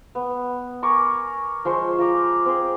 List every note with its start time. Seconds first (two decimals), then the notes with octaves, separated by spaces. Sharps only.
0.15 B3
0.82 A#4 G#5 C#6 D6
1.65 F3 G#3 C5 C#5
1.98 F4 A#5 D6
2.46 C4 G#4